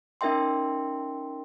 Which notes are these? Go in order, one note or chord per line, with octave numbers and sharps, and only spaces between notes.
C#4 D#4 A#4 E5 G5 C6